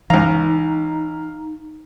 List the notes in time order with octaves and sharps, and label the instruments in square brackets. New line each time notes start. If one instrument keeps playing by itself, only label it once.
[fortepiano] C#2 A#5 [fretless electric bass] E3 [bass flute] D#4 [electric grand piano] F5